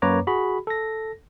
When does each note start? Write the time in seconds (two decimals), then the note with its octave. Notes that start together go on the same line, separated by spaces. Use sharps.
0.02 F#2 A#3 B4 C#5 A#5 D6
0.27 F#4 G#4 B5
0.67 A4 A#6